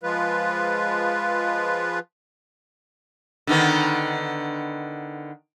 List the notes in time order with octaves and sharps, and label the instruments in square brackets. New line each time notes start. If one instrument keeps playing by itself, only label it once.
[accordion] F3 G#3 F4 B4
[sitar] D3 D#3 B3